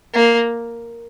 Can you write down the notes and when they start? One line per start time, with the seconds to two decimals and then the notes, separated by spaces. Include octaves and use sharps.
0.13 A#3